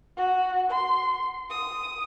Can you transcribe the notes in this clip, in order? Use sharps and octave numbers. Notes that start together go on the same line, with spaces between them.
F#4
C6
D#6